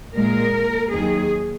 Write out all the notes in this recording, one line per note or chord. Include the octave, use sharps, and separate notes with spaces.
A#2 G#3 A#4
D#2 D#3 F#3 G#4